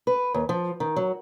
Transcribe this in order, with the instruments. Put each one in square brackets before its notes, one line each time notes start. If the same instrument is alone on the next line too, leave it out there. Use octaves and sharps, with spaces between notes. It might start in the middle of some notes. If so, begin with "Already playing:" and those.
[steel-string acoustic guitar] B4
D#2
F3
D#3
F#3